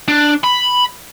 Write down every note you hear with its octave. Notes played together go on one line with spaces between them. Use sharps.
D4
B5